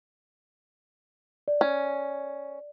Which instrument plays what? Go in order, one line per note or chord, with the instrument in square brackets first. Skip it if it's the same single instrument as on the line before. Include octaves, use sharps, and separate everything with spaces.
[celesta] D5
[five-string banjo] C#4